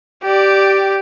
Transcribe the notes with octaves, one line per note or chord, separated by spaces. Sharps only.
G4 D5